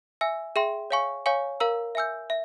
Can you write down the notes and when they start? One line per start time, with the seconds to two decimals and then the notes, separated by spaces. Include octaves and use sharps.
0.21 E5 G#5 E6
0.56 G#4 E5 G5 C6
0.91 C#5 F5 G#5 C#6
1.26 C#5 F5 G#5 C#6
1.60 A#4 F5 A#5 E6
1.95 E5 G#5 E6 G6
2.30 E5